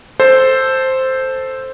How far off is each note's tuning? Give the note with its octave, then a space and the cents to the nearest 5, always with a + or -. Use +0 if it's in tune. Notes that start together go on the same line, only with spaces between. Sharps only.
A4 +0 C5 +0